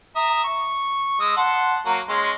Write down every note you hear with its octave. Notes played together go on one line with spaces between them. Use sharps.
E5 A#5 D#6
C#6
G#3 D#6 E6
F#5 A5 C6
F#3 A#3 F#5
G#3 C#4 C6